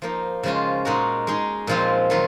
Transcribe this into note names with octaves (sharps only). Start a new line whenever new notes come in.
F3 A#3 D#4
C#3 F3 G#3 C#4 F4
A#2 G#3 D#4 F#4 A#4
G#3 D#4 G#4
A#2 F3 G#3 C4 F4
D#3 F#3 F4